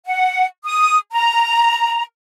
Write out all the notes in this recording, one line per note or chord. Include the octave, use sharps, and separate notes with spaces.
F#5
D#6
A#5